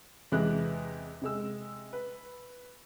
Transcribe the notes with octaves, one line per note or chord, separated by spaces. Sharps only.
E2 C3 E3 G#3 E4 F#6
C3 G#3 E6
B4